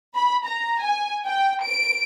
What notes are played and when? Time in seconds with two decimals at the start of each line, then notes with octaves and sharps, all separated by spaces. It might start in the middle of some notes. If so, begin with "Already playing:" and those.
0.15 B5
0.44 A#5
0.81 G#5
1.26 G5
1.64 D7